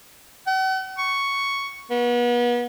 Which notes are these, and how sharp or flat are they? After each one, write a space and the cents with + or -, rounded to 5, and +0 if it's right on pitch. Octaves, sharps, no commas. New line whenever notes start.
F#5 +45
C#6 +5
B3 -35